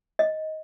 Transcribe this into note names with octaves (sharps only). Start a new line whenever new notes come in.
D#5